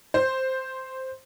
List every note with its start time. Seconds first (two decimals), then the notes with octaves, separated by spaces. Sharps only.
0.14 C5